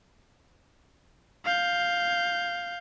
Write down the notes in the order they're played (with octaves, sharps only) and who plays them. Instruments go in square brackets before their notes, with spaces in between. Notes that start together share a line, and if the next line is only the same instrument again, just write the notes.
[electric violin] F5 G6